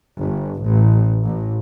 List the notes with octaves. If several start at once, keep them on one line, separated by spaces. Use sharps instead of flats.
G1
A1
A1